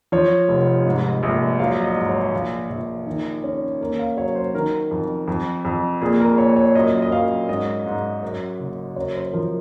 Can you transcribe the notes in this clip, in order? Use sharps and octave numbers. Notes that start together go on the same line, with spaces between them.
F3 C#5
F1
G#2
A#1
F#3 F5
D#5
G#2
C#5
A#1 F5
A#1
D#3
C#4
A#3
F5
F#3 C#5
C5
D#3 A#4
F2
F2
F2
A#2 G#4
A#4
A#2 C#5
C#5
F#2 D#5
D#5
F#2 F5
G#2 D#5
G#2
F#2
F#1
F#2 C#5
C5
F3 A#4